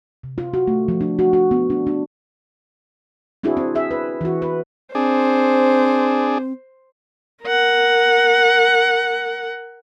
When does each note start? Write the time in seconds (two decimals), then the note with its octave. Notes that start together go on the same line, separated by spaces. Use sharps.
0.24 C3
0.38 F4
0.54 F#4
0.68 A3
0.88 F3
1.01 D4
1.19 F#4
1.33 F#4
1.51 B3
1.70 D4
1.87 D4
3.43 C4 D4 E4 F#4 G#4
3.57 C4
3.75 G#4 E5
3.91 B4
4.21 E3 F#4
4.42 B4
4.95 C4 D4 G#4 C5
7.43 A#4 F#5